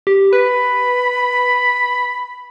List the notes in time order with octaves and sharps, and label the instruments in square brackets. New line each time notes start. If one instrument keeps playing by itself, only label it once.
[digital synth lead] G4
[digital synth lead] B4 [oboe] B5